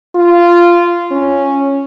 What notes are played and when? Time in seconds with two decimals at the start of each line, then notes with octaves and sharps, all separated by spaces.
0.15 F4
1.11 C#4